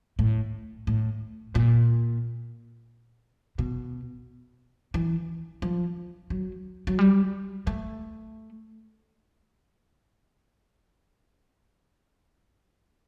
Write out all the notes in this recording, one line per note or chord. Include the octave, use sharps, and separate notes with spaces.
A2
A2
A#2
B2
E3
F3
F#3
F#3
G3
A3